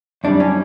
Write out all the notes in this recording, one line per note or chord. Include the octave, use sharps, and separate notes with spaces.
F#2 E3 G3 D4
C#4